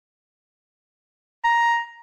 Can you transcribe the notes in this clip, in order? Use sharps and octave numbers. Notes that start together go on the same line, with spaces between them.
A#5